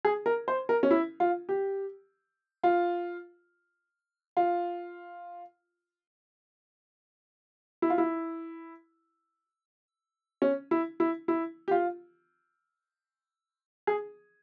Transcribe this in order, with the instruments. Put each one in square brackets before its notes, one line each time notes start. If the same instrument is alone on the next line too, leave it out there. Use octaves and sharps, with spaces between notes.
[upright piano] G#4
A#4
C5
A#4
C#4
E4
F4
G4
F4
F4
E4
F4
E4
C#4
E4
E4
E4
G4
F4
G#4